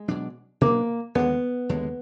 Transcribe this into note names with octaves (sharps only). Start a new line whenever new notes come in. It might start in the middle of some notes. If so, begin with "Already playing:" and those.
Already playing: G#3
B2 F#3 D4
B2 F#3 A#3 D4
D#2 D3 G#3 B3
D#2 D3 G#3